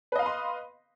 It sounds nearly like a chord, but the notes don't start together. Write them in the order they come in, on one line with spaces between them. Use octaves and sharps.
B4 D#5 F5 B5 C6